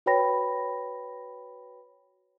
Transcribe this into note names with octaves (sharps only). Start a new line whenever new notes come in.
F#4 B4 C#5 G5 B5 A#6